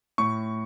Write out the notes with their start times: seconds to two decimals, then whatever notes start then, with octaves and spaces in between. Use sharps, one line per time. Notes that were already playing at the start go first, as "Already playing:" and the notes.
0.18 A2 C#6